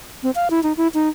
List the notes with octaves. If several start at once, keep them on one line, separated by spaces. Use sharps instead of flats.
C4
F5
E4
D#4
E4
D#4